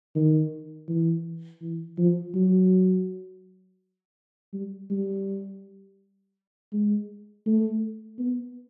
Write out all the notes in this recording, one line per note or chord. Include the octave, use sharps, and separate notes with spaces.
D#3
E3
E3
F3
F#3
G3
G3
G#3
A3
B3